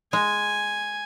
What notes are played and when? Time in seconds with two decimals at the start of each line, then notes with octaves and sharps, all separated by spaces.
0.13 G#3 G#5